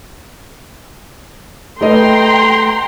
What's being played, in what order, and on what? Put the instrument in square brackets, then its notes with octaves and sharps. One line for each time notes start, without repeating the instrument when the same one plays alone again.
[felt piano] A3 B4 D#5 [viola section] G5 A#5 C6